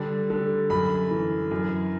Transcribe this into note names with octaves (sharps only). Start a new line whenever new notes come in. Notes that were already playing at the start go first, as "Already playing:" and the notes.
Already playing: D3 G3
D3
F#2 B5
E3
F#2